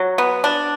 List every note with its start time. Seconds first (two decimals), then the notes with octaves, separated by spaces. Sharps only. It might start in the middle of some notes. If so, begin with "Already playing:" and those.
Already playing: F#3
0.18 B3
0.44 D4